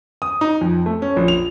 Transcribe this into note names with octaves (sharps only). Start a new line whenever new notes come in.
D#6
D#4
F2
A3
C#4
A#1
F7